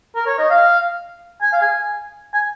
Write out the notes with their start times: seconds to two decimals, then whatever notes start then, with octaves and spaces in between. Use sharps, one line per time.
0.16 A#4
0.27 C#5
0.39 D#5
0.50 F5
1.42 G#5
1.53 F5
1.62 G#5
2.34 G#5